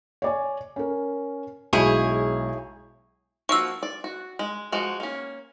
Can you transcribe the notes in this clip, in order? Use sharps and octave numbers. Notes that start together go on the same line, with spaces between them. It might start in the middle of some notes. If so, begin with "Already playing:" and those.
C#5 D5 G#5
C#4 A#4
B1 G#3 E4 G#4 C#5 G6
F3 A#3 F#4 C#6 E6
D5
F#4
G#3
F3 G#3 F#4
A#3 C#4